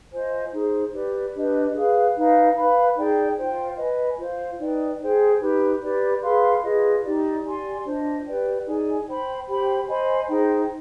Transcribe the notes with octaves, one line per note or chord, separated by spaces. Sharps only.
F4 C5 D#5 G#5
D#4 G#4 C5
G4 B4 D5
D4 G4 B4 D#5
G#4 B4 F5
D#4 B4 F5
B4 F5 B5
D#4 G#4 D5 G5
F4 C5 G5
B4 D#5 G#5
F4 C5 F5
D#4 B4 D5 G5
G#4 C5 G5
D#4 G4 B4
G4 B4 D5
G#4 B4 F5 C6
F4 G#4 B4 D#5
D#4 G4 D5
G4 D5 G#5 C6
D4 F4 C5 D#5
G4 B4 D5 G5
D#4 G#4 D5 G#5
C5 G5 B5
G4 C5 G5 B5
C5 D#5 G#5 B5
D#4 G#4 C5 G5